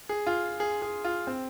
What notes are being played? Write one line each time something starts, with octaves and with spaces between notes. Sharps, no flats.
G#4
F4
G#4
G#4
F4
C4